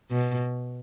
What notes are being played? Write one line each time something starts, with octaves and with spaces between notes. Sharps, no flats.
B2